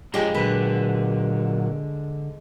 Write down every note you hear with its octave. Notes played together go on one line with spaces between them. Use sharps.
F2 F3 G#3 D4 G4 C#5
A#2 D3 F#3 B4